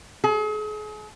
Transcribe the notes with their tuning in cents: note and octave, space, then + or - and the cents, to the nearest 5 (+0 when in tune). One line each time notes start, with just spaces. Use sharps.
G#4 +40